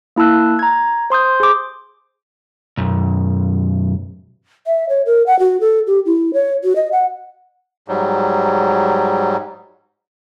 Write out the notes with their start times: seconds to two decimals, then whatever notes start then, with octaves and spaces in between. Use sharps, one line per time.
0.16 A#3 E4 A5 E6 F#6
0.59 A#5 G#6
1.10 C5 C6 D#6 G6
1.40 G#4 D6
2.77 B1 F#2
4.67 E5
4.89 C#5
5.06 A#4
5.27 F#5
5.39 F#4
5.61 A4
5.87 G4
6.06 E4
6.34 C#5
6.64 F#4
6.76 D#5
6.92 F#5
7.88 G#2 F#3 G3